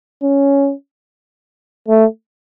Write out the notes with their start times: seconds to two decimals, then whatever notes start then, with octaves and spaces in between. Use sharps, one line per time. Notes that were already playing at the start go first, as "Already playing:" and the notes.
0.23 C#4
1.88 A3